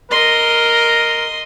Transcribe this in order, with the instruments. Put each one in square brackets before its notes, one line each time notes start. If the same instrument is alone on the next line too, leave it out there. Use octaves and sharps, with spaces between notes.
[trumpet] A#4 [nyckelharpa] D#5 C6